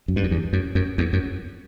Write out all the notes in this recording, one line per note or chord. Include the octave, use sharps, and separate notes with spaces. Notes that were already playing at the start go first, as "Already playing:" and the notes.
F#2
G2
F#2
E2
F#2
F#2
E2
F#2